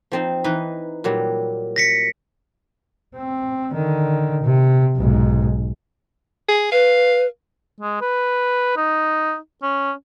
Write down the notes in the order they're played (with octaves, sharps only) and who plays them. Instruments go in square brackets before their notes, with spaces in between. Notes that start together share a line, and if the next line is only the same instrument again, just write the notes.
[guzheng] F3 C4 D#4
E3 D#4 B4
A#2 F#3 G3
[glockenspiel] A#6 B6 C#7
[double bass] C4
D3 D#3
C3
B1 G#2
[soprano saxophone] G#4
[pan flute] B4 [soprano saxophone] F5
[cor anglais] G#3
B4
D#4
C#4